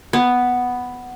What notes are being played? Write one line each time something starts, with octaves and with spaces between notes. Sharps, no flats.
B3